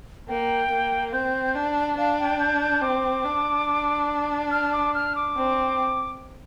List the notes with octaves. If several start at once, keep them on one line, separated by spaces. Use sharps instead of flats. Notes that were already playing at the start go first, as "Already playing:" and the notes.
A#3 G5
A#3
C4 G6
D4
D4 F5
G5
G6
G6
C4 D6
D4
F6
D6
F6
D6
C4